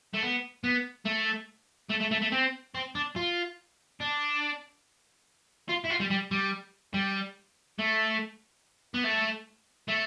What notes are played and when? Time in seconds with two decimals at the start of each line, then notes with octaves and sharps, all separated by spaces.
0.14 A3
0.23 B3
0.64 B3
1.06 A3
1.90 A3
2.01 A3
2.11 A3
2.22 A3
2.32 C4
2.75 C4
2.95 D4
3.16 F4
4.00 D4
5.69 F4
5.84 E4
5.90 F4
6.00 G3
6.10 G3
6.31 G3
6.94 G3
7.79 A3
8.94 B3
9.04 A3
9.88 A3